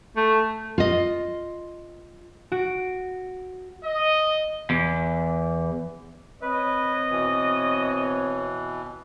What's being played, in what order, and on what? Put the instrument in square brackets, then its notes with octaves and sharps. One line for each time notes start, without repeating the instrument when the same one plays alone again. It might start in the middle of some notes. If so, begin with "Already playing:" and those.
[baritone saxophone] A3
[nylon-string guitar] F4 D#5
[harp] F#4 D7
[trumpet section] D#5
[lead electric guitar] E2
[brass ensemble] C4 C#5 [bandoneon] B4 [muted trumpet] D#5
[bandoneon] B2 E3